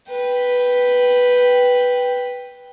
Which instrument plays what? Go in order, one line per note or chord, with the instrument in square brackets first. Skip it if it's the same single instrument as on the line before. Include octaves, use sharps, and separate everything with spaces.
[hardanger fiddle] B4 G5